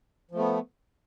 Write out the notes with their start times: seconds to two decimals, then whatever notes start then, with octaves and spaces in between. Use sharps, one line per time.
0.31 F3
0.35 A3
0.39 B3